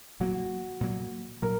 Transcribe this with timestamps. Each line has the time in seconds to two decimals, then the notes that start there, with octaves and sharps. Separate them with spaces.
0.20 A#2 F#3 A#3 F#4
0.81 A#2 F#3 A#3
1.42 A#2 F#3 A#3 A#4